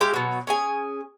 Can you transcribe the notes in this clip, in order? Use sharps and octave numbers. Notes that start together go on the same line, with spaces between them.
G#3 G4 E5 F5
B2 F#3
C#4 G#4 G#5